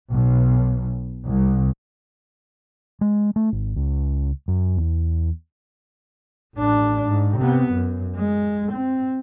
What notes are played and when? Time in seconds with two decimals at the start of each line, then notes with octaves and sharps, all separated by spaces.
0.10 B1
1.26 C2
3.01 G#3
3.36 A3
3.53 G#1
3.76 C#2
4.48 F#2
4.77 E2
6.55 A1 D4
7.06 G#2
7.38 C3 B3
7.73 F#2
8.16 G#3
8.73 C4